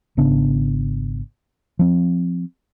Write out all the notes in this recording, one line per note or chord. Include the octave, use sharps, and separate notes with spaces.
G#1 C#3 B3 D4
F3 C4